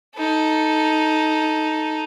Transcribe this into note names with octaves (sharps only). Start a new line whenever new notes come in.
D#4 A4